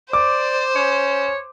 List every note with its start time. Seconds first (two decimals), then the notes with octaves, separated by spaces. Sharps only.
0.13 C5 D5 D6
0.76 C#4 C#5